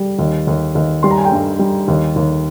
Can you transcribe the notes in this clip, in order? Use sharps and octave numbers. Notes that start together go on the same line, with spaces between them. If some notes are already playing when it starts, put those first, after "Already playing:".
Already playing: G3
D#2
D#2
D#2
G3 C6
A#5
G#5
G5 A#5
G2
G3
D#2
D#2